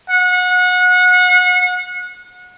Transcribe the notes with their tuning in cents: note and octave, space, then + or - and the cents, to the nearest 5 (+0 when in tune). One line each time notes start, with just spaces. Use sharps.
F#5 -30